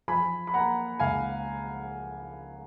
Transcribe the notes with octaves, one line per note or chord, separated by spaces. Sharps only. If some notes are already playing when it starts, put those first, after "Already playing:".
F3 G#5 B5
B5
A#3 F#5 A#5
C#2 F5 G#5